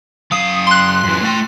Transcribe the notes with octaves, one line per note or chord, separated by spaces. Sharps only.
F#2 F5 D#6
C6 F#6
F#2 E3
A3 G5